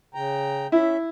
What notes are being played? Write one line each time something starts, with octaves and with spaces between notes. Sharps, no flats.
C#3 G5 A#5
C#4 E4 E5